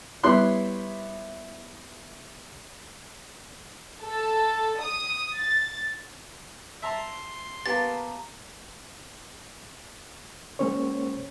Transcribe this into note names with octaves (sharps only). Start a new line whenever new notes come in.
G3 B3 E4 C#5 C6 F#6
A4
D#6
A6
E5 A5 A#5 C6
A#3 B3 G4 B4 A5 A6
G#3 A#3 C#4 C5 C#5